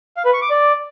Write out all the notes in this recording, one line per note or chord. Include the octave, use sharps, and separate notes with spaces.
F5
B4
C#6
D6
D5